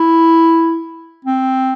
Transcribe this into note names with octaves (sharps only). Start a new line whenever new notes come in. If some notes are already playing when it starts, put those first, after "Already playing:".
Already playing: E4
C4